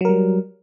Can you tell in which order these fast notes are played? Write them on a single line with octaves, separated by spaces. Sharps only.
F#3 A#4 G3